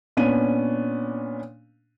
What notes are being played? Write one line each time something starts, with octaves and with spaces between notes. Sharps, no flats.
A#2 B3 C#4 D4 D#7